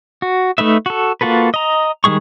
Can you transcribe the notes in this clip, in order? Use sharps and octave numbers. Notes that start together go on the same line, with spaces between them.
F#4
A3 D#4 B4 E5
F#4 A4
A#3 F4 F#4 A4 B4
D#5 A#5
D#3 G3 G#3 G#4 C#6